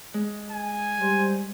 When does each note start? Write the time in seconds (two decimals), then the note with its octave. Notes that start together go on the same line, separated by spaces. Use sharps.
0.14 G#3
0.52 G#5
1.00 G3 C5